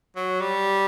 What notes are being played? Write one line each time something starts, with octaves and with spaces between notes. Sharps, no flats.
F#3
G3